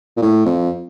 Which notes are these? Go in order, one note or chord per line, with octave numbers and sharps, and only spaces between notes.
A#2
A2
F2